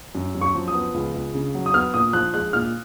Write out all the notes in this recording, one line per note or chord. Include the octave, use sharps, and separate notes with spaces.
F#2
F#2
C#6
F3
D#6
B3
C#2
C#2
C#3
F#3
D#6
B3 F6
A#2 D#6
F3 F#6
G#3 F#6
A#2 F6